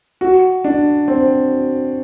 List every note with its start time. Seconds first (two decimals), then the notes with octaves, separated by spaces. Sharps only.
0.21 F#4
0.64 D4
1.08 C4